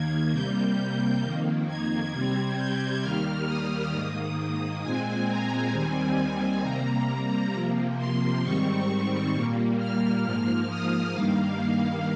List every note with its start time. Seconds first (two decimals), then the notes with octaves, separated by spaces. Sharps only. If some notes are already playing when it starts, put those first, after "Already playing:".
Already playing: D#2 D#3 A#3 G#6
0.32 C3 G3 A#3 G6
1.22 F2 D#3 A#3
1.68 G#6
2.12 C3 G3 C4
2.57 G6
3.02 D#2 D#3 G3 A#3 F6
3.47 D#6
3.92 G#2 D#3 A#3
4.83 A#2 G#3 C4 G#5
5.28 A#5
5.73 D#2 D#3 G3 C4 G#5
6.63 C3 G3 A#3 A#5
7.54 C3 F3 A#3
7.98 C6
8.43 G#2 D#3 G3 C4 C#6
9.34 A#2 G3 A#3
9.79 F6
10.24 G#2 F3 A#3
10.69 D#6
11.14 G2 D#3 G3 A#3 F5